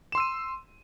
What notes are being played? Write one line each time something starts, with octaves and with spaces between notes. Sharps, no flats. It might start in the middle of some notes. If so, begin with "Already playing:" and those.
C6 E6 D#7 E7